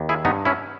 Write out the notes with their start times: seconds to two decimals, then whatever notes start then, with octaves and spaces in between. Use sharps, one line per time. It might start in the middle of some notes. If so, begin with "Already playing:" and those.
Already playing: D#2
0.09 E4 G#4
0.25 G2 B3 D#4
0.45 C#4 E4